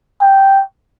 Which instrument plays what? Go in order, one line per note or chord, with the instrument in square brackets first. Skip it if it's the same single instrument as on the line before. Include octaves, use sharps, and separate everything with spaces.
[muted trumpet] G5